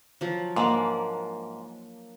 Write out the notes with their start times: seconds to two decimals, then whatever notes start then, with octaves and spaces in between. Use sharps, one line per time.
0.21 F3 F#3
0.56 G#2 A#3 D4 D5